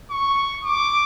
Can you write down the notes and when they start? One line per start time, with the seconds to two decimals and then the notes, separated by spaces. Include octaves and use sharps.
0.11 C#6
0.64 D6